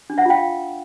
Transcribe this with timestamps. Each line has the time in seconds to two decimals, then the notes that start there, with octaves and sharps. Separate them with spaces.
0.10 D4
0.18 E5 F#5
0.25 F4 F5 G5